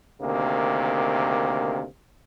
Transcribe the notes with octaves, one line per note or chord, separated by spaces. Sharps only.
D2 C3 D#3 A#3